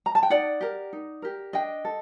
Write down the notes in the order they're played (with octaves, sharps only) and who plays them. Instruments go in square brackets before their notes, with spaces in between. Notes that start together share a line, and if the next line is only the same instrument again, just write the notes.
[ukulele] A#5
A5
G5
D#4 D5 F#5
G4 A#4
D#4
G4 A#4
D4 D#5 G5
A4